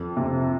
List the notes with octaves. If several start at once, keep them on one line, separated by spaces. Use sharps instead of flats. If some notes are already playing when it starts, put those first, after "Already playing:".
Already playing: F2
C3